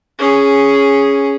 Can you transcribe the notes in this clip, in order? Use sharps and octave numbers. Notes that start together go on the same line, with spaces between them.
C#4 G#4